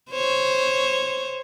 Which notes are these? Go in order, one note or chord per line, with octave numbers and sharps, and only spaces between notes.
C5 C#5